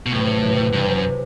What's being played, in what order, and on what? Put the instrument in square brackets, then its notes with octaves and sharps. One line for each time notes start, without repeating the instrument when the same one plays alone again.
[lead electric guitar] B2
[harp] F#1 E2 C3 [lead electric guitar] A2
[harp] F#1 E2 C3
[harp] F#1 E2 C3 [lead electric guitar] G2
[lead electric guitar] F#2
[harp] C3